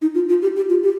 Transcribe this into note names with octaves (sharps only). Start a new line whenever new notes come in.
D#4
F4
F4
G4
G4
F4
G4